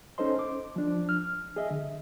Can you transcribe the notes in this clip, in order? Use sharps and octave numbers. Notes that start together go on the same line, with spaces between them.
C#4 D#4 A4 C5 D#5 C6
D6
F3 D4
F6
G#4 D#5 E5
D3